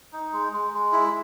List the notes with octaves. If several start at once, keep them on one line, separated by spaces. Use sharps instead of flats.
D#4
G#3
G#3
G#3
E4